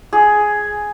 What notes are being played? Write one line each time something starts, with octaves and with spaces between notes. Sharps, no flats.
G#4